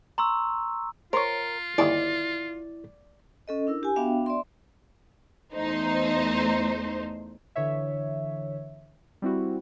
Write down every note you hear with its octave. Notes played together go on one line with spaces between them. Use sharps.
A#5 C6 C#6 E6
F4 A#4 C5 C#5
G1 D#2 E4 G#4 D5
C#4 A4 D#5
D4 E4 A#4 E6
G4 G#5
B3 D4 F#4 E5 F5 G5
D5 E5 C6
E2 A3 D#4 C5
D3 E3 C#5 E5
G3 C4 E4 F#4